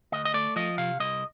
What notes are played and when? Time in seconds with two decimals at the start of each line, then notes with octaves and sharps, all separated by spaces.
0.12 D2 D#5
0.25 D#5
0.34 A3 D5
0.56 F3 D#5
0.78 C3 F5
1.00 C2 D#5